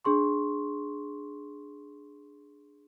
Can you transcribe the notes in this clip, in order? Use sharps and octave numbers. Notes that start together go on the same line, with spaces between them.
D4 G#4 C6 C#6